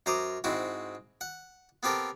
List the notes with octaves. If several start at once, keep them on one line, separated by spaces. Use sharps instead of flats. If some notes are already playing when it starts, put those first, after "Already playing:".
F#2 C5 A#5 D6 D#6
G#2 C4 E4 F#4
F#5
B3 C4 G4 A4 A#4